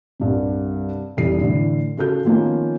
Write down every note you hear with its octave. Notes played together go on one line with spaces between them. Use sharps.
C2 G2 C3
F1 E3 G3 C7
A2 D3 E3
C#3 F#4 A4 G6
D#3 F3 A#3 B3 C#4